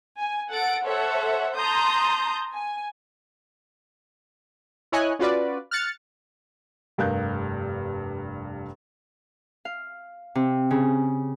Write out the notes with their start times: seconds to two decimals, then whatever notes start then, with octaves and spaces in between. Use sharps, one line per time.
0.17 G#5
0.50 A4 F#5 A6 D7
0.84 A4 C5 C#5 E5 F#5
1.55 A5 A#5 C6 D#6 G6
2.52 G#5
4.92 E4 C#5 D#5 G#5 F#6
5.19 C#4 F4 F#4 B4 D5
5.71 F6 F#6 A6 C#7
6.98 F1 G2 A#4 F5 F#6 G6
9.65 F5
10.35 C3
10.71 C#3